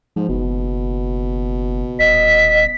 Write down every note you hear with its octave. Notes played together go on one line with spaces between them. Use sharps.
G#2 F3
F#1 B2
D#1 D#5 B6